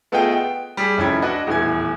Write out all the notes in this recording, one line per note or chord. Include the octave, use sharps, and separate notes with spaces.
A3 B3 F4 G#4 D#5 G5
G5
G3 G#4
F1 F2 C#4 E4 B5 G#6
D4 F#4 B4 D#5 F#5
D#1 E2 A2 G#5 G#6